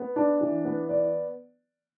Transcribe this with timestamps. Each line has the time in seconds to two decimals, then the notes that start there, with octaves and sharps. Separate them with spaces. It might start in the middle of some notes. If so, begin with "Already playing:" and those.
Already playing: B3
0.16 D4
0.41 E3
0.65 B3
0.89 D5